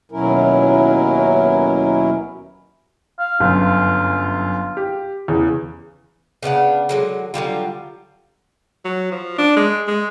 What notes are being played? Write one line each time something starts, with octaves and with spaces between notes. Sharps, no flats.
D#2 B2 F#3 C#4 E4 A#4
F5
G1 F#2 F4
G4
E2 C#3
C#3 B3 D4 F#5
D3 F#3 G#3
D3 F#3 G3 F4
F#3
F3
D4
G#3
G#3